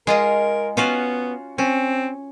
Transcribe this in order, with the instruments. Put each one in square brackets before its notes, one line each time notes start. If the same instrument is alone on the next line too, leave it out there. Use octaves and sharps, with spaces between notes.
[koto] G#3 F4 D#5 [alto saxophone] A#4
[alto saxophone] B3 [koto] C#4 F4 F#4
[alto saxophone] C4 [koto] C#4